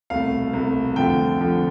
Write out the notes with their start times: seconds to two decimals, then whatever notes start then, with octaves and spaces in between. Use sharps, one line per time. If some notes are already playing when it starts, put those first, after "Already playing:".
0.10 C2 B2 A3 F5
0.53 C2 B2 A3
0.96 F2 D3 F3 A3 G5
1.41 F2 D3 F3 A3